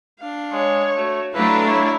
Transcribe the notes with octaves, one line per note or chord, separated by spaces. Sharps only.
D4 F5
G#3 C#5
A3 F#4
F#3 A3 D4 E4 B4 F5 A#5
E4 C#5